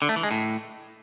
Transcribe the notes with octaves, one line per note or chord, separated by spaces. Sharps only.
D3
A3
E3
G#3
A2